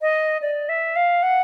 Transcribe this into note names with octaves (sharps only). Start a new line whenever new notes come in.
D#5
D5
E5
F5
F#5